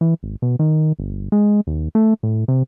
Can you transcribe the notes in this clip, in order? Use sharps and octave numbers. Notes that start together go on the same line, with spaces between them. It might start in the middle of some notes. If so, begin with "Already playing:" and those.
E3
G#1
B2
D#3
G1
G#3
D#2
A3
A2
C3